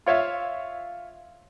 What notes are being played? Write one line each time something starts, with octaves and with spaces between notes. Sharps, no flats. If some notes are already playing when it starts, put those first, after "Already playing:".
F4 C#5 E5 F5